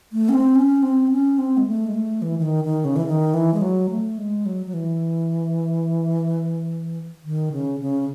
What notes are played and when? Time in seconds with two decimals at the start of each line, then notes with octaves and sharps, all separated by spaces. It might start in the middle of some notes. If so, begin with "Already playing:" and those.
0.13 A3
0.29 C#4
0.34 C4
0.55 C#4
0.83 C4
1.11 C#4
1.38 C4
1.57 G#3
1.67 A3
1.87 G#3
1.94 A3
2.22 E3
2.39 E3
2.42 D#3
2.64 D#3
2.85 C#3
2.96 E3
3.06 D#3
3.34 E3
3.54 G#3
3.62 F#3
3.90 A3
4.18 G#3
4.46 F#3
4.66 F#3
4.74 E3
7.24 D#3
7.52 C#3
7.80 C#3